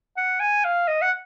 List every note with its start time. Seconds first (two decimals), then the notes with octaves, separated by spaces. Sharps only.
0.17 F#5
0.40 G#5
0.65 F5
0.88 D#5
1.02 F#5